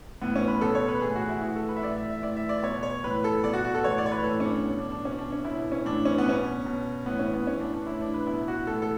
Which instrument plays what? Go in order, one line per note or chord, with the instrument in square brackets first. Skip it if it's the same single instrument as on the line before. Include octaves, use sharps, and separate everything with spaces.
[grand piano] A2 E3 B3
C#4
B4
B2 A4
C#5
B4
A2 E3 G#4
F#4
E4
A2 E3 F#4
A4
B4
E5
A2 E3 D5
E5
E5
A2 E3 D5
E5
D5
B2 C#5
C#5
A2 E3 B4
A4
B2 D5
F#4
F#4
A4
A2 E3 C#5
D5
C#5
B4
A2 E3 A4
C#4
D4
B2
D4
D4
B2 C#4
D4
C#4
B2 E4
C#4
A2 E3 D4
C#4
B3
B2 C#4
B2
A2 E3 B3
C#4
B3
A2 E3 C#4
D4
D4
A2 E3 E4
D4
B4
B2 E4
F#4
A2 E3 A4
A4